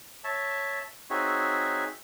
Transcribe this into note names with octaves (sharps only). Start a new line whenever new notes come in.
C#5 E5 A5
C4 D#4 F#4 G#4 C#5 E5